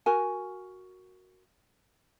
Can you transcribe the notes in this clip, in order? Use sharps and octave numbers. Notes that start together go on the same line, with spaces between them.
F#4 A#4 G#5